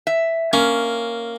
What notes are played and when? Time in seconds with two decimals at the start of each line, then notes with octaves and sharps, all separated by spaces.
0.07 E5
0.53 A#3 C#4